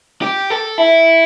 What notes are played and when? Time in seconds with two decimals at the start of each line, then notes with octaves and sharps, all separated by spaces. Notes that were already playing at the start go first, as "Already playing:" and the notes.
0.22 G4
0.50 A4
0.78 E4